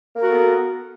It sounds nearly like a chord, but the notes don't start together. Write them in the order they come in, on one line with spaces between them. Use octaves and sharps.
A#3 A#4 F#4 A4 B3